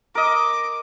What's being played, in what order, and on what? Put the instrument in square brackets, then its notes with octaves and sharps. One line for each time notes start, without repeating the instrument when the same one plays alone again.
[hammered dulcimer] A#4 D#5 [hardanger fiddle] D6